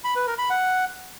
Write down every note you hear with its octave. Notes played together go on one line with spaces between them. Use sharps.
B5
B4
A#4
B5
F#5